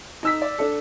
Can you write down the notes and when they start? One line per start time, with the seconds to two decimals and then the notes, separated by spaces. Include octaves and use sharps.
0.23 D#4 E6 B6
0.42 D5
0.59 D4 A4